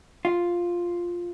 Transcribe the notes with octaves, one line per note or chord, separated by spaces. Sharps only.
F4